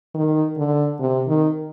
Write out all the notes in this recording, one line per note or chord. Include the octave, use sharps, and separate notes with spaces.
D#3
D3
C3
D#3